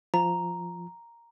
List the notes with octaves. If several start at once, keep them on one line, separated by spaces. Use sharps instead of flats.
F3 A#5